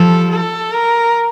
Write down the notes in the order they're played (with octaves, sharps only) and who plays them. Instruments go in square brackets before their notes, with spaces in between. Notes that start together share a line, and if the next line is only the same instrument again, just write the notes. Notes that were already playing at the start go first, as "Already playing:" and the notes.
Already playing: [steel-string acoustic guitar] F3 G3 [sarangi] A4
[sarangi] A4
A#4